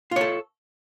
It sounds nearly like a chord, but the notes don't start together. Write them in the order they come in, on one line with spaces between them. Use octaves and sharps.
F4 C#5 A4